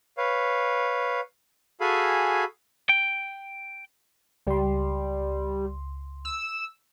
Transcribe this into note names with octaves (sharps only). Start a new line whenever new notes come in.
B4 C#5 F5
F#4 G#4 A4 F5 G#5 B5
G5
C#2 G3 C6
E6